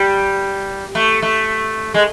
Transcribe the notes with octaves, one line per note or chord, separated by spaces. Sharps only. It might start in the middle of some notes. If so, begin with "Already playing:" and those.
Already playing: G3
A3
A3
G#3